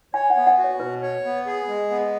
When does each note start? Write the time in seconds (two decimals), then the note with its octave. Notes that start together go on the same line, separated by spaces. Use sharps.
0.14 C#5 G#5
0.30 F#5
0.36 B3
0.47 F#5
0.58 F#4
0.64 C#5
0.80 B2 B4
1.02 C#5
1.25 B3
1.46 G#4
1.68 G#3
1.90 B3